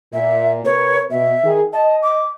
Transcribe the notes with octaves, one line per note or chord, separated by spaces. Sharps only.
A#2 E5
C3 A#4 B4 C#5
B2 E5
D#3 G#4
D#5 A5
D6